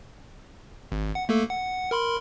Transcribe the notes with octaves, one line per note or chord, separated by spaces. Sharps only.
G#1
F#5
A3 A#3 A4
F#5
A#4 B5 C6